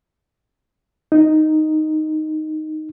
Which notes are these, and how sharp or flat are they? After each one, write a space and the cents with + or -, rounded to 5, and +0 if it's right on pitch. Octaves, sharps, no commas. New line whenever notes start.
D#4 -5